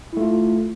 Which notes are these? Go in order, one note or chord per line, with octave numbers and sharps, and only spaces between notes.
A3 E4 F4